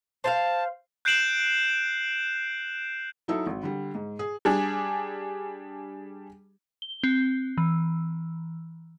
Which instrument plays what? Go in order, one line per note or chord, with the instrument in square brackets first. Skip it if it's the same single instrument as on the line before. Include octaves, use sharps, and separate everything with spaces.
[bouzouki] C5 E5 F5 [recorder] A5
[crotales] F#6 G6 C7 D7 E7 F#7
[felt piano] F#3 D#4 E4 A4
G#1
D3 G3
G#2
G#4
[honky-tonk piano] G3 D4 G#4
[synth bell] G7
C4
E3